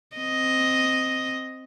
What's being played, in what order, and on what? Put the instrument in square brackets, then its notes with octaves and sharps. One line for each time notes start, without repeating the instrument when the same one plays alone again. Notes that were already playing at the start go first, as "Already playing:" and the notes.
[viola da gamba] C4 D#5